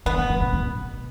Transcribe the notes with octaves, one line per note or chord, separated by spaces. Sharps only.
D3 B3
D3
C#3
B2
B2